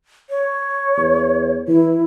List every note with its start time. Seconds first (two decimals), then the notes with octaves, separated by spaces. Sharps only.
0.30 C#5
0.97 E2
1.68 E3 E4